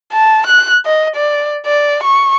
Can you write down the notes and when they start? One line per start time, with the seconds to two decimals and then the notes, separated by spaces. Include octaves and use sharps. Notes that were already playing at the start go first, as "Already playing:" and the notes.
0.13 A5
0.47 F#6
0.86 D#5
1.16 D5
1.66 D5
2.04 C#6